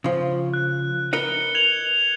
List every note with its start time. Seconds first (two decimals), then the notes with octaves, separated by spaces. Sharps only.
0.04 C#3 F3
0.54 F#6
1.13 A#4 B4 D#5 C#7 G7
1.55 G#6 F7 F#7